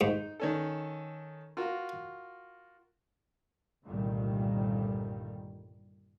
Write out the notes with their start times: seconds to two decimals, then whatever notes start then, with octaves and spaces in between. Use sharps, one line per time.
0.01 G#2 D#4
0.40 D#3 C#4 A4
1.57 F4 F#4 A#4
3.86 G1 C2 A#2 D#3 G3 A3